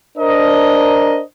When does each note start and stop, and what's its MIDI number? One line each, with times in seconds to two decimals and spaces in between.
0.18 1.21 62
0.18 1.21 70
0.18 1.21 72
0.18 1.21 75